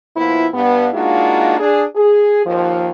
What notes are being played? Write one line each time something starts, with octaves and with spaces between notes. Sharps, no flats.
A#2 F3 B3 E4
G2 B3
G#3 A#3 D4 D#4 F4 F#4
D4 G#4
G#4
D#2 F3